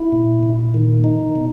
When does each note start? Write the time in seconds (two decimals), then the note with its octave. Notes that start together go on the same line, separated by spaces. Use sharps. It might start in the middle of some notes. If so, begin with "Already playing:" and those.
Already playing: E4
0.12 A#2
0.43 A#2
0.74 D#3
1.04 D#4
1.36 B2